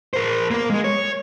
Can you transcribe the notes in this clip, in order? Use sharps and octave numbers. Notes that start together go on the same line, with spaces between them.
A#4 C5
A#3 A#4
G#3 G#4
C#5